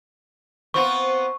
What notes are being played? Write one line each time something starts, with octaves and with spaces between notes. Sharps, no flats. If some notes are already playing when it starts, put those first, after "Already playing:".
B3 C4 F4 C#6